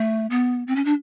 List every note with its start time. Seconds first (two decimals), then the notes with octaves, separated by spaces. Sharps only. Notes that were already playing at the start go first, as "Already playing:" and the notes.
Already playing: A3
0.30 B3
0.67 C4
0.76 C#4
0.85 D4